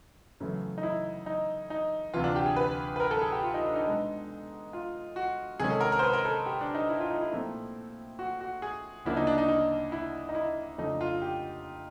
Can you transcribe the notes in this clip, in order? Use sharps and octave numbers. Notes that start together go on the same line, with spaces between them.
F#2 C#3 E3 A3
D#4
E4
D#4
D#4
D2 C3 E3 F4
D4
G4
G#4
B4
B4
A#4
A4
G#4
G4
F4
D#4
D4
D#4
B2 G#3 B3 D4
F4
F#4
C3 D#3 G#3 C#4 G#4
A4
A#4
A#4
C5
B4
A#4
A4
G4
D4
D#4
E4
F4
D#4
E4
A#2 F3 A3 C4
F#4
F#4
G#4
D2 C#3 F3 A#3 D4 E4
D#4
D4
D#4
D#4
E4
D#4
E4
F2 C#3 F3 A3 D4 D#4
F4
G4